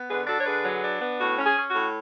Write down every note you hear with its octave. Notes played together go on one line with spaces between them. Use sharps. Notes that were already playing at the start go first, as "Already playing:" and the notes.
Already playing: B3
D3 G#4 B4
D4 F#4 A4
C#5
D3 G#4 B4
F#3
D4
B3
A2 F#4
C#4
G#4
C#4
F#4
A2